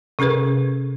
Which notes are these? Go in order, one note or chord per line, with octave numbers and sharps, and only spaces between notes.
C3 C#4 G#4 A#4 B4